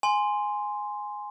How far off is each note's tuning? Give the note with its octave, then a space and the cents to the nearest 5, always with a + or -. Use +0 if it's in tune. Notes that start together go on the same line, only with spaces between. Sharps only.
G#5 +0 C6 +0